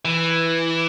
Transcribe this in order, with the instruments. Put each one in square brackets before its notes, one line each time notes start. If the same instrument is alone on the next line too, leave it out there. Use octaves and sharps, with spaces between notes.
[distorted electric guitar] E3